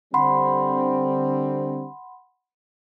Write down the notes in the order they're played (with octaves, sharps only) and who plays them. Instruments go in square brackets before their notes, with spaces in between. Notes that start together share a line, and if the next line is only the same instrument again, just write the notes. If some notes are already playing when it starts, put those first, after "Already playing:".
[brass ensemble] D3 G3 C4 [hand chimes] F#5 B5 C6